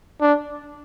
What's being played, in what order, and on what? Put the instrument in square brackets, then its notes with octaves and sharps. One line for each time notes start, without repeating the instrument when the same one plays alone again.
[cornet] D4